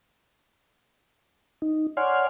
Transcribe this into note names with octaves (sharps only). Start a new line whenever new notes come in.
D#4
C#5 D5 F#5 G#5 C6 F6